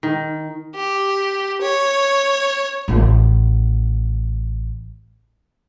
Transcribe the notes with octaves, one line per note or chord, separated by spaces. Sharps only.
D#3
G4
C#5
A1 A3